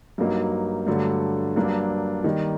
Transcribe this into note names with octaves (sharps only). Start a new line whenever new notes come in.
G2 F#3 A#3 D#4
G2 D3 F#3 A3
G2 F#3 A#3 D4
D#3 G3 A#3